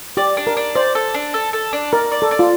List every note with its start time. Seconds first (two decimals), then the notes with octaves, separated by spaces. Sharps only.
0.17 G4 D5
0.37 D4
0.47 A#4
0.57 D4
0.75 C5 D5
0.95 A4
1.14 D4
1.34 A4
1.53 A4
1.73 D4
1.92 A#4 D5
2.12 D5
2.22 A4
2.31 D5
2.39 F4